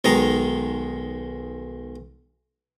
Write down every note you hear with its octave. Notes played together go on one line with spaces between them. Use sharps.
B1 D#3 G#3 A#5 D#6